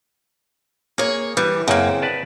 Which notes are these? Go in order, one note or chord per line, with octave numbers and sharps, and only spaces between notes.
A#3 G#4 C#5
E3 G3
F#2 C#3 A#3 C4
B4 D5 A5